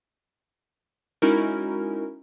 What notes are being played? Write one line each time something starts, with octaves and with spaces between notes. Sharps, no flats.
G#3 C#4 D#4 E4 F#4 A#4